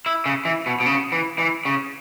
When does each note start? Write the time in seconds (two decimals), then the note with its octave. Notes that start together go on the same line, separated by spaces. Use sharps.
0.06 E4
0.26 C#3
0.45 E3
0.66 B2
0.80 B2
0.86 C#3
1.12 E3
1.39 E3
1.65 C#3